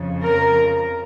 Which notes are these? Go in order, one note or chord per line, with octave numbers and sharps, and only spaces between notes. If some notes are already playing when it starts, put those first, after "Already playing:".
Already playing: F2 C#3 F3
A#4